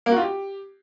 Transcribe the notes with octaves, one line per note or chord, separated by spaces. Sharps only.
A#3
F#4
F4
G4